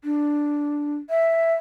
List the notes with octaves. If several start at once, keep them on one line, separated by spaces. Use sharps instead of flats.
D4
E5